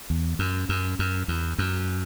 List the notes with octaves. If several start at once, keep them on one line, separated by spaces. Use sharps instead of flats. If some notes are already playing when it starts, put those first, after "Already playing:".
E2
F#2
F#2
F#2
E2
F#2